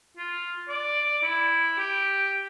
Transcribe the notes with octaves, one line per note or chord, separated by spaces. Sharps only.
F4
D5
E4
G4